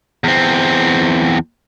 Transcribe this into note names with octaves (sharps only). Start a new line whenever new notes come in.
E2 C4